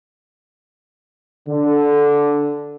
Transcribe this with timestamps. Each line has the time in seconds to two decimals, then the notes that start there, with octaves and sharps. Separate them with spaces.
1.48 D3